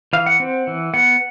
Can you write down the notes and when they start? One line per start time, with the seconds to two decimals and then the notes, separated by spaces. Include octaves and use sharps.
0.13 E3 F5
0.26 F#5
0.40 C4
0.67 E3
0.94 B3 F#5